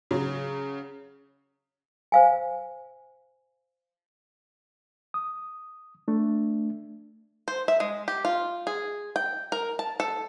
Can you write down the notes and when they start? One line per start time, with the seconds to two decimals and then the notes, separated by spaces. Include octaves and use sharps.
0.11 C#3 F#3
2.12 C5 F5 G#5
5.14 D#6
6.08 A3 D4
7.48 C5
7.68 E5
7.80 G#3
8.08 G4
8.25 F4
8.67 G#4
9.16 G5
9.52 A#4
9.79 A5
10.00 A4